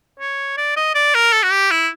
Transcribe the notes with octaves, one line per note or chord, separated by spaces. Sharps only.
C#5
D5
D#5
D5
A#4
A4
F#4
G4
E4